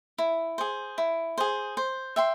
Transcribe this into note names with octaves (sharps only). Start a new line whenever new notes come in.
E4
G#4 C5
E4
G#4 C5
C5
E5 G5 C6